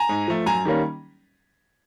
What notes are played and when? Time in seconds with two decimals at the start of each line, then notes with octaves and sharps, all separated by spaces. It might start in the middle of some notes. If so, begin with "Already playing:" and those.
Already playing: G#5 A#5
0.09 G#2
0.28 F3 A3
0.46 F#2 G#5 A#5
0.65 D#3 G3 A#3 C#4